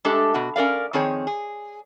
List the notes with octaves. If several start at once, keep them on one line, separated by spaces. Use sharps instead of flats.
G#3 A3 D4 G4 A4
B2 F#4
C#4 A#4 D5 F5
F2 D#3 C4 G#4 C#5
G#4